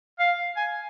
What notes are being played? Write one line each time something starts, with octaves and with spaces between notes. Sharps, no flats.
F5
G#5